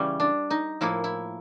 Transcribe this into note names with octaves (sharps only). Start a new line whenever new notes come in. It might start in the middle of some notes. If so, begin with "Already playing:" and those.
Already playing: C#3 E3 G3 C#4
D4
D#4
A2 F3 A#3 E4
E4